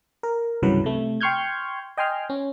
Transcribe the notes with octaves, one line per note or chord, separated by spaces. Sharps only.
A#4
C2 G2 C#3 E3 F#3 B4
C3 A3
G5 C6 C#6 F6 G6 G#6
D#5 G5 G#5 C6 F6
C#4